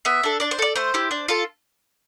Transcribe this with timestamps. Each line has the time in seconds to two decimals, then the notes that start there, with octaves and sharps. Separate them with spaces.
0.05 B3 E5
0.23 D4 A4
0.40 D4 D5
0.51 C5
0.59 A4 D5
0.76 A3 C5
0.94 E4 G4
1.11 D4
1.28 F4 A4